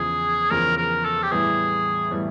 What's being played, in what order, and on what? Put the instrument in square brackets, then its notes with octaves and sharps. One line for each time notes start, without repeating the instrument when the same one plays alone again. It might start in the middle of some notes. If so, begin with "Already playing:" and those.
Already playing: [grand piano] E2 C#3 F3 [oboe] G#4
[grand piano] E2 C#3 F3 [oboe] A#4
[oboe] A#4
A4
G4
[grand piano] A2 E3 G3 B3 [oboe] G#4
[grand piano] A2 E3 G3 B3